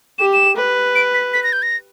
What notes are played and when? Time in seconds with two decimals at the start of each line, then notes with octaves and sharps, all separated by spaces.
0.18 G4 E7
0.33 E7
0.57 B4
0.95 D7
1.14 B6
1.33 B6
1.43 A#6
1.53 G6
1.62 A#6